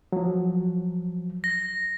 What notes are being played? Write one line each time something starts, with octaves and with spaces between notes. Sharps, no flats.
F3 F#3
A#6